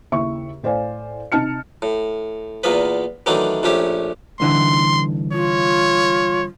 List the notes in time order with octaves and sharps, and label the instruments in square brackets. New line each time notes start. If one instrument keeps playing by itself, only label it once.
[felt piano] D#2 C#3 E4 E5 C#6
A2 C5 D5 F5 G#5
C3 D#4 A5 F6 C#7
[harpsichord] A2
E2 A#2 A#3 B3 B4
D#3 E3 F#3 A3 D4
A#1 A#2 A3 C#4 G4
[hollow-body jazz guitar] C2 D3 E3 [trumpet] C6
[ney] F4 [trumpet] C#5